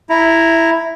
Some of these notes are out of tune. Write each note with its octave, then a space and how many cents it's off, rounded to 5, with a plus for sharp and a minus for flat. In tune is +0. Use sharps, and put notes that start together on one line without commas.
E4 +0 A#5 +0